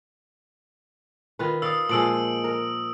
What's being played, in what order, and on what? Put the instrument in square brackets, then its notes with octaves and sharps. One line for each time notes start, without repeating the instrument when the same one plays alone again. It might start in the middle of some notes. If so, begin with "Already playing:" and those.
[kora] D#3 F4 B4
[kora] D5 F5 [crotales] D#6 E6
[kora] A#2 F3 G#3 [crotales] E6 D7 F#7
[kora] A#4